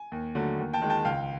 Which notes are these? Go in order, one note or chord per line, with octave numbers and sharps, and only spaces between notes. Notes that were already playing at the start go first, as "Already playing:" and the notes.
Already playing: G#5
D#2
D3 F#3 A3
D#2
G5 A5
D#3 G#3
G5 A5
C#2 F5 G5